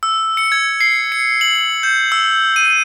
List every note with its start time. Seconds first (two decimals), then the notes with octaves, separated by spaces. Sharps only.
0.03 E6
0.37 C#7
0.52 G#6
0.81 C7
1.12 C#7
1.41 F#7
1.83 G6
2.12 E6
2.56 D#7